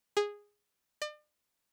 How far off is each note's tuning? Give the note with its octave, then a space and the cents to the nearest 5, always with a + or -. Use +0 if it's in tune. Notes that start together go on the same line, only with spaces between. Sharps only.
G#4 -10
D5 +40